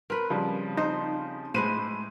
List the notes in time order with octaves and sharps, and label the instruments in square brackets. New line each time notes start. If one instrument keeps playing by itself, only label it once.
[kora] C4 B4 [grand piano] A#4
[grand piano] C#3 F3 G3
[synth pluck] D#4 [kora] C5
[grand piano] A2 D#7 [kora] G#3 B4 C5